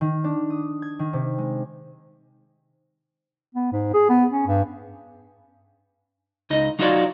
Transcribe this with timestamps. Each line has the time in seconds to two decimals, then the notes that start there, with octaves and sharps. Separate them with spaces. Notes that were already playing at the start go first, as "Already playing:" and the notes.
0.01 D#3
0.24 D4
0.50 D#6
0.82 G#6
0.99 D#3
1.13 C3
1.38 G#3
3.54 B3
3.72 G#2
3.93 G#4
4.09 B3
4.30 C#4
4.47 G2
6.50 C#2 D#4 D#5
6.79 F#3 D#4 F4 F#4 C#5 D5